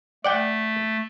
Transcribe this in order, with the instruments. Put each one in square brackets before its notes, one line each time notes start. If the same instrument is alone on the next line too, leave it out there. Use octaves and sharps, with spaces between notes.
[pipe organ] A3 [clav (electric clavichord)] D5 F#5 G5